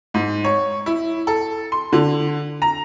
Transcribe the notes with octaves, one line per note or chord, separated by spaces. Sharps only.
G#2
C#5
E4
A4
C6
D3
A#5